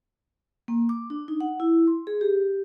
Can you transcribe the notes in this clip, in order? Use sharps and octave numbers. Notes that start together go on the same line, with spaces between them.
A#3
D6
D4
D#4
F#5
E4
C6
G#4
G4